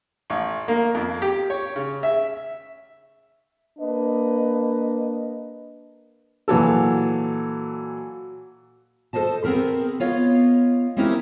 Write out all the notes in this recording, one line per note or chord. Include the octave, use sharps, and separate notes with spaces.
A1
A#3
F2
G4
C#5
C#3
E5
A#3 D4 B4 D#5
A#2 E3 F#3 A4
A4 A#4 C5 D#5 A5
B3 C4 G#4 A#4 B4
B3 F4 C#5 D#5 F5
C4 C#4 D#4 E4 G4 A#4